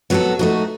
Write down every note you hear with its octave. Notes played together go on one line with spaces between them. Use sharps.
F#3 B3 F#4 A4
A3 D#4 F#4